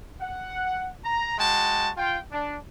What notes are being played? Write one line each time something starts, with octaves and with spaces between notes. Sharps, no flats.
F#5
A#5
G#3 F#4 G5 A5
F4 G5
D4